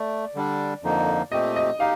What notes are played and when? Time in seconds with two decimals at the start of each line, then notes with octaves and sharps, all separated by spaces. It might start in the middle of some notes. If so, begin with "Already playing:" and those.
Already playing: A3 D5
0.35 D3 G3 D4
0.83 F2 D3 F3 A#3 D#4
1.31 A#2 A3 C4 G4 D#5
1.56 D#5
1.79 D#4 G4 F5